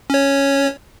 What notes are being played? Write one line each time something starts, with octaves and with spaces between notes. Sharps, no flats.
C#4 C#5